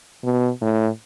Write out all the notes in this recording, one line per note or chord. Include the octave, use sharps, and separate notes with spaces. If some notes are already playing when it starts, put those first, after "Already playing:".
B2
A2